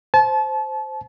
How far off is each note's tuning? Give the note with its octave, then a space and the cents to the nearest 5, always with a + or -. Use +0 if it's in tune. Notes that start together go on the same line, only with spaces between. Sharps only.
C5 +0 A5 -30